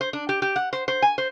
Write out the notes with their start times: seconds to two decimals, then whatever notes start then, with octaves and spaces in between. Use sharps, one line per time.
0.01 C5
0.13 D4
0.29 G4
0.42 G4
0.56 F#5
0.73 C5
0.88 C5
1.02 G#5
1.18 C5